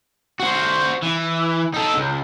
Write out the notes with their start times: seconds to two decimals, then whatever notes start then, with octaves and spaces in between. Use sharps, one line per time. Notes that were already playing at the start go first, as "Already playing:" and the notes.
0.40 F#4 C5
1.03 E3
1.74 D#4 A4
1.97 C#2